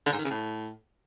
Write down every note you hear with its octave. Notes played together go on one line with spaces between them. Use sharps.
D3
G#2
D#3
C#3
A2